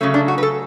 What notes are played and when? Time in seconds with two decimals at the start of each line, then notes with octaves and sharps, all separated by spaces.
0.01 C#3 F#3 A3 C#4
0.14 D4
0.28 F#4
0.38 B4
0.43 A4